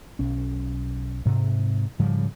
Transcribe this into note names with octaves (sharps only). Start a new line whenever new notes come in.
B1 C#4
G#2 C3
G#2 C#3 F3 G3